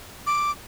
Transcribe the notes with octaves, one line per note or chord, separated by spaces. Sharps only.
D6